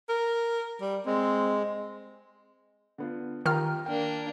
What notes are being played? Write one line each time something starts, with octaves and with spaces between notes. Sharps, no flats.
A#4
G3
G#3 C4
D3 B3 F4
D#3 F4 G4 A#5 F6
A#3 D4 G5